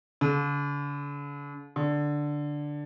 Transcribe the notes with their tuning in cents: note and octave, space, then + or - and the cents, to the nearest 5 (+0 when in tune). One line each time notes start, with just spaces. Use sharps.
D3 -45
D3 +0